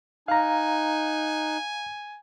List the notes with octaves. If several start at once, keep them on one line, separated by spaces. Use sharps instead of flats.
D#4 F5 G#5 A#5 F#6